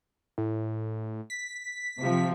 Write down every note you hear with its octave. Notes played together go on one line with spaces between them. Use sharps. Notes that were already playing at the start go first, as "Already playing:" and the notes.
A2
B6
C3 F3